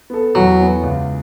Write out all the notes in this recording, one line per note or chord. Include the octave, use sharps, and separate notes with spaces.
B3 A4
E2 F#3
E3 B3
C#2